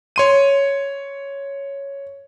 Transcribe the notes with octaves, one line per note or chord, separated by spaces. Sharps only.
C#5 C6 D#7